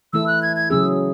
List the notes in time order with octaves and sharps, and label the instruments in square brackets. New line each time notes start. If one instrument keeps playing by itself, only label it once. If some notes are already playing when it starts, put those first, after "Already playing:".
[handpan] E3 A3 E4 A4 [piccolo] E6
[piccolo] F#6
G#6
G#6
[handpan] C#3 F#3 C#4 G#4 [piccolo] E6